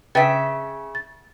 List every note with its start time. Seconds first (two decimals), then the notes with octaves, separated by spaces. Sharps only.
0.15 C#3 B4 E5 G5 A6
0.95 A6